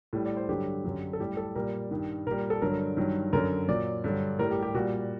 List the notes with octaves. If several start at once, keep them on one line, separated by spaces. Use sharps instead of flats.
A2 G3
D5
C5
G2 D3 F#3 G4
F#2 D3 F#3
A4
A2 G3 G4
A4
A#2 G3 A#4
G2 D#3 G3
A#2 G3 A#4
A4
G2 D3 F#3 A#4
G2 D#3 F#3
F#2 D3 F#3 A#4
A#2 F#3 D5
G2 D3 F#3
A2 G3 A#4
G4
G4
A#2 G3 F#4